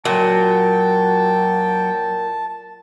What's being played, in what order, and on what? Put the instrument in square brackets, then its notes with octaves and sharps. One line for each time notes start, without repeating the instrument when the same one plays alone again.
[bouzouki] A#2 [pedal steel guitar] F#3 F#4 [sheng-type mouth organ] G5 [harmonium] A5